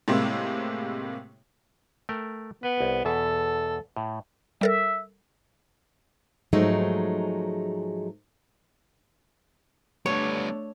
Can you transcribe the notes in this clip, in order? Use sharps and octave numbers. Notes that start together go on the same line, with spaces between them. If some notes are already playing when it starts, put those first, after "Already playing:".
A2 C3 G#3 A#3 C4 E4
A3 A#4 G5
B3 B4
C2
E2 B2 A4 E5
A2
G3 A4 A#4 E5
G#2 F3 F#3 G#3 A3 D#4
G3 A3 B3 D4 C#5